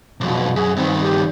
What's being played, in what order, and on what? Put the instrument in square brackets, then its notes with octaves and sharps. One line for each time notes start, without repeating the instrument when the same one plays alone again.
[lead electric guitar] B1 F2 [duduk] B2
[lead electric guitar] F#2 [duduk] G#4
[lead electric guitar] G2 D#3 [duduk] C4
[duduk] G4